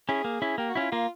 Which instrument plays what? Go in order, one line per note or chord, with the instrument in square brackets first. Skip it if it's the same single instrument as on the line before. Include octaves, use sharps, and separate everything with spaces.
[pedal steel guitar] C#4 E4 [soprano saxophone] G#4
[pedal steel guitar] A#3
C#4 E4
[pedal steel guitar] A#3 [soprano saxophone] G4
[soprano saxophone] F#4
[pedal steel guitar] C#4 E4 [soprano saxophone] F4
[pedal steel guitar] A#3 [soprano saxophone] F4